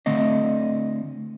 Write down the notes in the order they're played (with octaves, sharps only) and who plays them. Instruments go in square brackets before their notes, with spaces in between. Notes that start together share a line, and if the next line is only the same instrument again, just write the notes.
[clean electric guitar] D3 A3 C4 D#5